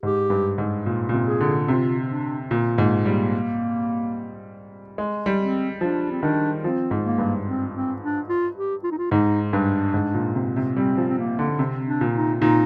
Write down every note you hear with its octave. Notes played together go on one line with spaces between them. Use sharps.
G#2 G4
G2
G#2
A#2
A#2
C3
G#4
D3
C3 F4
D4
A#2
G#2 A#3
G3 A#3
G#3
G3
C4
F3 D4
C4
D#3 D4
F3 C4
G#2
A#3
G2
C4
C4
D4
F4
G4
F4
D#4
F4
G#2 D#4
G2 D4
G#2
A#2
C3
C3
G3 C4
F3
C4
A#3
D3
C3 C4
D4
A#2
D#4
A#2 D#4